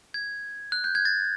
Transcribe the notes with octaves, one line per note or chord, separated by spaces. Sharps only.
G#6
F#6
G6
G#6
A6